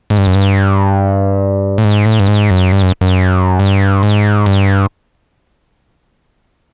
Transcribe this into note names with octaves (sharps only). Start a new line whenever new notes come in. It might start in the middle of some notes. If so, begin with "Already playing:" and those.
G#2
G2
F#2
G2
A2
G#2
A2
G2
G#2
F#2
G2
F#2
F#2
G2
G#2
G2